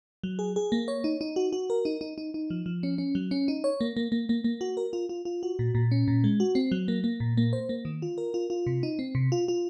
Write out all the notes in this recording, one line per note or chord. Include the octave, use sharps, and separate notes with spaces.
F#3
G#4
G#4
A#3
C#5
D#4
D#4
F#4
F#4
A#4
D#4
D#4
D#4
D#4
F3
F3
C#4
C#4
F#3
C#4
D#4
C#5
A#3
A#3
A#3
A#3
A#3
F#4
A#4
F4
F4
F4
F#4
A#2
A#2
C#4
A#2
G#3
F#4
C4
F#3
A#3
A#3
A#2
A#3
C5
A#3
D#3
F4
A#4
F4
F4
C3
D#4
C4
C3
F4
F4